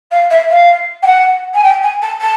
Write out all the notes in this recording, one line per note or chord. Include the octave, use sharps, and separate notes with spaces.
F5
E5
F5
G5
F#5
G#5
G5
G#5
A5
A5